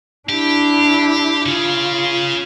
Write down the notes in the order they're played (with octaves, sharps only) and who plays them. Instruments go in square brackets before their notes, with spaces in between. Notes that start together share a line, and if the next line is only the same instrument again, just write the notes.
[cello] D4 E4 [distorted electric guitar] G4
[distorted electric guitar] C#3 C#4 [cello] F4